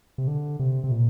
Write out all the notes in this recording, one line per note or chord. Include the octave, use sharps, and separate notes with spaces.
C3
D3
C3
C3
A#2